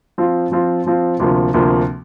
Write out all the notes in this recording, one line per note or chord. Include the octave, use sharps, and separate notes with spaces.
F3 C4 F4
F3 C4 F4
F3 C4 F4
D2 C3 F3 A#3
D2 C3 F3 A#3